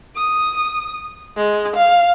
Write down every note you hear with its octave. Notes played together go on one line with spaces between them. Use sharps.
D#6
G#3
F5